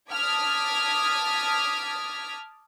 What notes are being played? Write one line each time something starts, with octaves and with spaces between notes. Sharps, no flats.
A5 D6 D#6 F6 G#6 B6